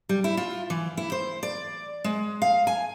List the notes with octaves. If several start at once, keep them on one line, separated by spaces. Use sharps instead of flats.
G3
E4
F4
E3
E4
C5
D5
G#3
F5
G#5